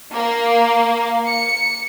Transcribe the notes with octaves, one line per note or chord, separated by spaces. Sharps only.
A#3
C#7